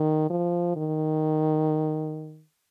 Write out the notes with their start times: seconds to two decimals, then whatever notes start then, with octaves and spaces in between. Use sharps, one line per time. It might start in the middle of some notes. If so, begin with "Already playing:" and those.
Already playing: D#3
0.30 F3
0.76 D#3